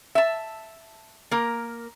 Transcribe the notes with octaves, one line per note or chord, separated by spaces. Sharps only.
E5 A5
A#3 A#4